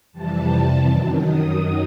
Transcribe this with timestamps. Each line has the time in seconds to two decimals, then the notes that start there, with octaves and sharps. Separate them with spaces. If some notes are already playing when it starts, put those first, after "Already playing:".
0.12 F2 C3 E3 G3 A5
0.84 F#2 D#3 F#3
1.20 D#6